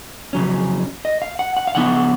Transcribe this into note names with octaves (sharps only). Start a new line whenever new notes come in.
F2 C#3 F#3 C#4
D#5
F5
F#5
F#5
F5
C#3 F3 B3 D#4 F#5